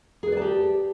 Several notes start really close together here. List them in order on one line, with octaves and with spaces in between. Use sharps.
G#4 B4 D5 A5 G4